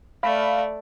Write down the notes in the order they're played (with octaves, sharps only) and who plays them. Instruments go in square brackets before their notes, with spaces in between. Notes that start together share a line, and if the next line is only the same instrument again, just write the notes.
[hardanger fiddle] A3 D5 [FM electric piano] F5 B5